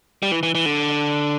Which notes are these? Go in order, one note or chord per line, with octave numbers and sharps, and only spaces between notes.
G3
E3
E3
E3
D3